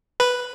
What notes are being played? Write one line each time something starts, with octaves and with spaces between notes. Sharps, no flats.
B4